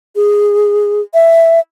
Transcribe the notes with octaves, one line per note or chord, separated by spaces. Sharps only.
G#4
E5